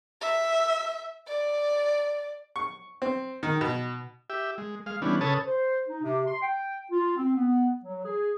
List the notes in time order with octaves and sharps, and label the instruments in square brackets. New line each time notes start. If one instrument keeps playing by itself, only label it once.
[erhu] E5
D5
[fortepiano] C#6
C4
D#3
B2
[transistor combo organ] G4 E5
G#3
G#3 F5
E3 G3 B3 C#4 D4
C#3 A4 B4 C#5 A5 D#6
[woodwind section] C5
D#4
C3
C6
G5
F4
C4
B3
F#3
G#4